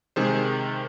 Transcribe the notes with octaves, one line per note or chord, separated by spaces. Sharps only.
C3 D#3 G#3 G#4 C5